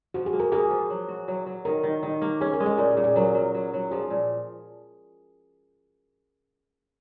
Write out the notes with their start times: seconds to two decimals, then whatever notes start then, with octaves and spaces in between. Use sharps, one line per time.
0.14 F3 F#4
0.26 G#4
0.33 A#3
0.40 A#4
0.52 A#3 G#4
0.70 F3
0.90 F#3
1.08 F#4
1.28 F#3
1.46 F#3
1.65 D#3 A#4
1.83 D#3
2.03 D#3
2.22 A#3
2.41 C#4 G#4
2.53 A#4
2.60 G#3
2.66 G#4
2.78 A#2 A#4
2.91 G#4
2.97 A#2
3.04 G#4
3.16 F#3 A#4
3.35 F#3
3.55 F#3
3.74 F#3
3.91 F3 G#4
4.10 A#2